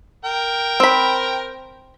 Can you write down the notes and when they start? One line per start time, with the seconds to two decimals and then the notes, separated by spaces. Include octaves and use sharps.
0.24 A#4 G5
0.80 C4 B5